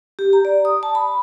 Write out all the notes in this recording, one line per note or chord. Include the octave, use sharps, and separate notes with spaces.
G4
A#5
D5
D#6
A5
B5